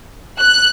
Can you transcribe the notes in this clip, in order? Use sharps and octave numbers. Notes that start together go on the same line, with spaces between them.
F#6